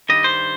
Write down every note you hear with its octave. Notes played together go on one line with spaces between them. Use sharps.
G2 D#3 G3 D#5
C5